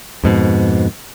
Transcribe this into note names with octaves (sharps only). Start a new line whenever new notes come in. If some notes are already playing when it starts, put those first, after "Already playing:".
F2 G#2 B2